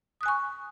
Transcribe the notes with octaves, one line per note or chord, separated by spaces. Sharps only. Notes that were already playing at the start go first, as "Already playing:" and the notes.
G#5 C#6 D#6 F#6